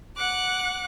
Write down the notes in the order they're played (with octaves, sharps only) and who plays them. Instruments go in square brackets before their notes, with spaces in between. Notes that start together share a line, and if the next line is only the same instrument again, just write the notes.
[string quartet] F#5 D6 F#6